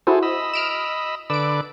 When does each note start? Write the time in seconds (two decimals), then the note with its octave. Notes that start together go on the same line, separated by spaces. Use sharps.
0.07 E4 F#4 G#4 A4 C5
0.23 D#5 B5 E6
0.54 F6 D7 E7
1.30 D3 B4 D5 E6 D7